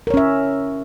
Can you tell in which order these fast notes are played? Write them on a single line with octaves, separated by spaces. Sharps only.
A#4 C#5 C#4 E5